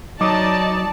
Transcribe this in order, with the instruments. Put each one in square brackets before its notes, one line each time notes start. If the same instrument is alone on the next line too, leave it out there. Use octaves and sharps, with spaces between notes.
[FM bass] F#3 [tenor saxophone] D#4 [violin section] D5 A5 [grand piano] D6 D#6